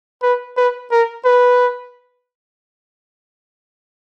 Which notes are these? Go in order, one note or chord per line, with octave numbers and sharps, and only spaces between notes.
B4
B4
A#4
B4